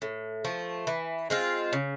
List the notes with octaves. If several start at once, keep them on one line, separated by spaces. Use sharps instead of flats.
A2
F3 A3
E3
G#3 C4 F4
C#3